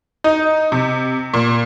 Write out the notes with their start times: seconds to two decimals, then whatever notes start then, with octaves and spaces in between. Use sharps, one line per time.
0.24 D#4
0.72 C3
1.34 A#2